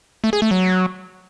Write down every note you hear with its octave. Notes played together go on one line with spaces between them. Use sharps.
A3
G#4
A3
F#3